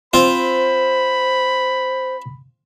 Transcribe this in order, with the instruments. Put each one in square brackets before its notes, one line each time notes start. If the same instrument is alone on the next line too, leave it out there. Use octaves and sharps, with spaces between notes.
[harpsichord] C4 F4 [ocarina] C5 [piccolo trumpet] B5